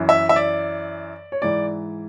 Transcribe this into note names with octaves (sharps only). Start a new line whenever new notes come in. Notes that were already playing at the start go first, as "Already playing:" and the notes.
Already playing: F#2 E3
E5
E5
D5
C#5
G#2 E3 D5